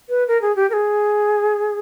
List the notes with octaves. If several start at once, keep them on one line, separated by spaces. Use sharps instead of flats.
B4
A#4
G#4
G4
A#4
G#4